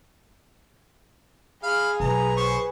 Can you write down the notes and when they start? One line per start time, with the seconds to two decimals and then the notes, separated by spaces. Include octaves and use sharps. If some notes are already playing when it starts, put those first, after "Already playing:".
1.63 G#4 F5 B5
2.00 B1 B4 G#5 A#5 B5
2.37 C5 C#6